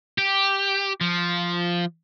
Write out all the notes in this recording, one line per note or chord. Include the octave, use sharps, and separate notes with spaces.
G4
F3